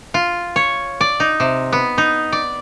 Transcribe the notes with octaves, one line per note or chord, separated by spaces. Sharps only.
F4
C#5
D5
D#4
C3
B3
D#4
D5